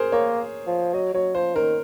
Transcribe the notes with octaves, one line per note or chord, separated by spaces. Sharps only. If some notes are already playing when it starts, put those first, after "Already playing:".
Already playing: G#4 A#4 C5
A#3 C#5
F3
F#3 D#5
F#3 C#5
F3 C5
D#3 A#4